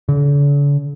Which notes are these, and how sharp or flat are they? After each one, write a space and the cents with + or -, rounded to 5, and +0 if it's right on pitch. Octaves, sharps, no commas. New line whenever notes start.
D3 -45